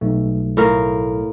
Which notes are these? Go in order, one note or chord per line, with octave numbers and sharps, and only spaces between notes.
B1 A3
A2 A#4 F5